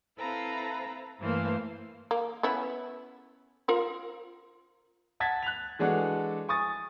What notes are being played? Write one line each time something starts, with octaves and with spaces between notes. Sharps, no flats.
C4 E4 A4 B4 F5 A#5
G2 E3 A3 A#3 C5 F5
A#3
B3 C#4 E4
F4 A#4 C5
F#5 A5 G#6 A6 B6
F#6 F7
E3 G#3 D4 F#4 A4
G#5 C#6 D#6 A6